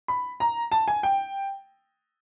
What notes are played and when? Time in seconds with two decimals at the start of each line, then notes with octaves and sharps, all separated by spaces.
0.08 B5
0.40 A#5
0.72 A5
0.88 G#5
1.03 G5